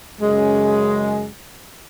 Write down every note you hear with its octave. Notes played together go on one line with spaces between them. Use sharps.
F#2 C#3 G#3 C#4